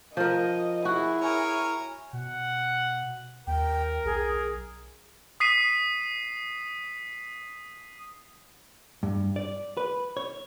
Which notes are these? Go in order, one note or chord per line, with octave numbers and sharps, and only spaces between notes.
F3 A#4 D#5
E4 F#4 G#4
A#4 C#5 G#5
B2 F#5
D#2 A#4 G5
B1 G#4
D#6 B6 C7 D#7
G2
D5
B4
C#5